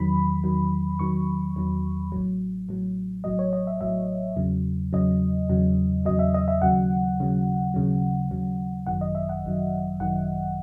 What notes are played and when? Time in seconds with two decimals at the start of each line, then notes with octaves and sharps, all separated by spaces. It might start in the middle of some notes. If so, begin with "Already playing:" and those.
Already playing: E2 D#3 F#3 B5
0.44 E2 D#3 F#3
0.99 E2 D#3 F#3 C#6
1.56 E2 D#3 F#3
2.12 A1 A2 F#3
2.68 A1 A2 F#3
3.24 A1 A2 F#3 D#5
3.39 C#5
3.53 D#5
3.67 E5
3.81 A1 A2 F#3 E5
4.36 E2 C#3 F#3
4.93 E2 C#3 F#3 D#5
5.50 E2 C#3 F#3
6.05 E2 C#3 F#3 D#5
6.19 E5
6.34 D#5
6.48 E5
6.62 D#2 C#3 F#3 F#5
7.18 D#2 C#3 F#3
7.74 D#2 C#3 F#3
8.31 D#2 C#3 F#3
8.86 G#1 F#2 D#3 F#3 F#5
9.01 D#5
9.15 E5
9.29 F#5
9.44 G#1 F#2 D#3 F#3
10.00 G#1 F#2 D#3 F#3 F#5